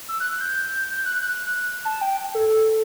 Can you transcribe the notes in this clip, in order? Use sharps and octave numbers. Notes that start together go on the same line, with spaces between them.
E6
F#6
F#6
G6
F#6
F#6
A5
G5
A4